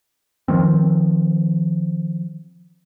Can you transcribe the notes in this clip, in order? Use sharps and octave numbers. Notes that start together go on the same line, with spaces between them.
D#3 F3 C4